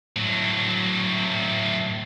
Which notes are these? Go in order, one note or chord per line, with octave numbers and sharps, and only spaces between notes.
A2 F#3